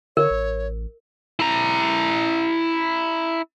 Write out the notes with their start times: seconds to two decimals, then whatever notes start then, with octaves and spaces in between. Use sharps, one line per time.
0.17 D3 A#4 C#5
0.31 A1
1.39 E4 A#5